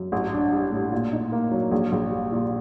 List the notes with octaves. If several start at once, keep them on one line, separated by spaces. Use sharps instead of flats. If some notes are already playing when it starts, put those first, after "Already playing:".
Already playing: F#2
A1
D4
G3
A2
A#2
D#4
A#3
F#3
A#1
A#1
G3
A#2